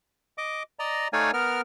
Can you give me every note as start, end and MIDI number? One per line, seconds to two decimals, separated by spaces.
0.38 0.63 75
0.38 0.63 86
0.79 1.08 74
0.79 1.08 75
0.79 1.08 82
1.13 1.31 57
1.13 1.31 63
1.13 1.31 73
1.13 1.31 74
1.13 1.31 77
1.13 1.31 80
1.33 1.61 59
1.33 1.61 70
1.33 1.61 89